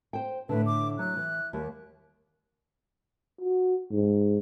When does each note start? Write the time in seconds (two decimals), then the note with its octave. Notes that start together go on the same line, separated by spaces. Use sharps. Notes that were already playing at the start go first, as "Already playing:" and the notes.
0.13 C5 G5
0.49 A2 D3 B4
0.66 D6
0.99 F#3 F#6
1.17 E3
1.53 D#2 G3
3.41 F#4
3.92 G#2